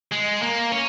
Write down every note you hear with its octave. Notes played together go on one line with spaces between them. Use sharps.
G#3
A#3
C#4